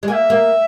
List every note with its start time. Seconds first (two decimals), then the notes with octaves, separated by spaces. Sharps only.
0.03 G#3
0.07 A#3 E5 G#5
0.30 A#3